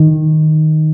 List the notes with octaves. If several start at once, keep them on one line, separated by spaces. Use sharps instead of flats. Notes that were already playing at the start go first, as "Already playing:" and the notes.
Already playing: D#3